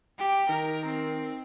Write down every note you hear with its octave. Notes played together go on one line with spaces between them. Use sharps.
G4 G5
D#3 A#4
C4